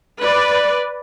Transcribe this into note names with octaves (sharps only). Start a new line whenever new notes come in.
B4 D5